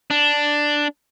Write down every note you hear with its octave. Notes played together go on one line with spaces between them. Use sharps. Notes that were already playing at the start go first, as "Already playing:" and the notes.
D4